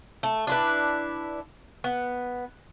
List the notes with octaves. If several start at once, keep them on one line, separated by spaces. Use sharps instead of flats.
A3
D4 E4 B4
B3